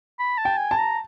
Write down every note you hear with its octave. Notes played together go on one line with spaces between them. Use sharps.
B5
A5
G5
G#5
A5
A#5